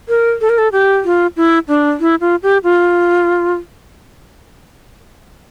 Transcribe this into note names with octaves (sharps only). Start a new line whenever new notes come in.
A#4
A4
A#4
A4
G4
F4
E4
D4
E4
F4
G4
F4